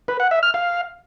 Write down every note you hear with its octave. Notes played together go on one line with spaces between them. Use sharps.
B4
F#5
E5
F6
F5